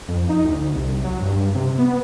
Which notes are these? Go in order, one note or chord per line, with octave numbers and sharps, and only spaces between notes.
F2
D#4
D2
C2
F#3
G2
G2
C3
B3